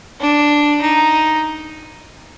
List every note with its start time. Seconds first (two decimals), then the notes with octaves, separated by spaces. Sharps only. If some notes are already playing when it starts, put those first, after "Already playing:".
0.21 D4
0.82 D#4